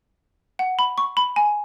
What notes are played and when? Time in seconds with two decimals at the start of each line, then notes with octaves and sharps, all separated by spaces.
0.59 F#5
0.79 B5
0.98 C#6
1.17 B5
1.36 G#5